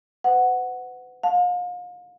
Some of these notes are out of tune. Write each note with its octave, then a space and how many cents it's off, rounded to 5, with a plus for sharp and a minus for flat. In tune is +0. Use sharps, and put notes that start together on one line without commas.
B4 +45 F#5 +0
F5 +40 A5 +0